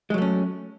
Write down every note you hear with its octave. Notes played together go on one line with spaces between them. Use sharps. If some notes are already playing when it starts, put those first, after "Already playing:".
F#3 G#3 A3 C#4